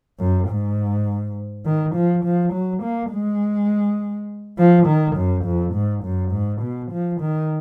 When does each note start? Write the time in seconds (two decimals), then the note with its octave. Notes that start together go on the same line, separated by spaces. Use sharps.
0.20 F#2
0.48 G#2
1.65 D#3
1.95 F3
2.25 F3
2.53 F#3
2.83 A#3
3.12 G#3
4.58 F3
4.87 D#3
5.17 F#2
5.45 F2
5.74 G#2
6.04 F#2
6.32 G#2
6.62 B2
6.92 F3
7.21 D#3